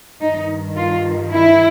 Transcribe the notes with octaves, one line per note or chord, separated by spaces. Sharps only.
G2 D#3 D#4
F4
E4